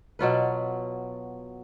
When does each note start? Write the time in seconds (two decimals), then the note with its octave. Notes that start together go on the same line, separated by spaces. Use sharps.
0.19 B2 F#3 F4 B4